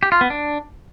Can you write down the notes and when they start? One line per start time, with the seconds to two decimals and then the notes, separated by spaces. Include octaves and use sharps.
0.03 G4
0.12 F4
0.21 B3
0.30 D4